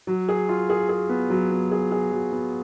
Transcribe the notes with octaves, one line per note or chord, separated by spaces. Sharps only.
F#3
G#4
F4
G#4
G#4
B3
F#3
B3
G#4
G#4
F#3
B3